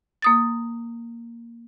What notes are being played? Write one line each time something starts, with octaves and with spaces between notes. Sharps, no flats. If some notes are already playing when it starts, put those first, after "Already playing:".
A#3 D#6 A6